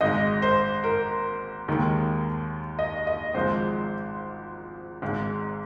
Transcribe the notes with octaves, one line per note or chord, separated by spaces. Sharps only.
G#1 G#2 G#3 D#5
C5
A#4
D#2 D#3 G#3
D#5
D#5
G#1 G#2 F3 G#3 C5
G#1 G#2 G#3